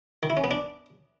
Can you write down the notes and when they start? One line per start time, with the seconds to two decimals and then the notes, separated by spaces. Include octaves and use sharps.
0.23 D#3
0.30 E4
0.37 C#4
0.44 B3
0.51 D4